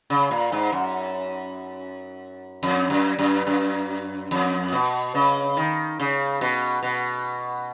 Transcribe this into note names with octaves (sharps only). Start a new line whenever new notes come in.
C#3
A#2
G#2
F#2
F2
F#2
F#2
F#2
F2
B2
C#3
D#3
C#3
B2
B2